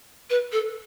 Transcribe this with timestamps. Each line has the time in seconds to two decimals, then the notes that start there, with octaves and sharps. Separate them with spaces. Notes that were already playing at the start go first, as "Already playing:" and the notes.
0.30 B4
0.52 A4